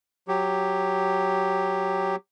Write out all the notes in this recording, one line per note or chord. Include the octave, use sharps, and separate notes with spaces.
F#3 G4